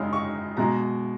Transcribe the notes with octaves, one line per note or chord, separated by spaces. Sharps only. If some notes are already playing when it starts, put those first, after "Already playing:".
Already playing: F#2 C#3 G#3 D#4 F6
C#6
B2 G#3 A#5